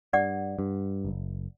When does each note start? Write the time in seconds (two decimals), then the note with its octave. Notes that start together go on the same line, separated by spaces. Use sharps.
0.13 G2 D5 F#5
0.59 G2
1.05 F#1